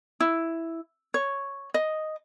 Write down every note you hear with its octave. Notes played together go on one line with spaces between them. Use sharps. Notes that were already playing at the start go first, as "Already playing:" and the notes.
E4
C#5
D#5